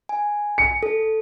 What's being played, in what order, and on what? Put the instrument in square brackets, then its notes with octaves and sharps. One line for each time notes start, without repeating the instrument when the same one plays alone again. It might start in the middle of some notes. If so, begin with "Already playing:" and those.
[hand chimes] G#5
[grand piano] C#7
[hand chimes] A4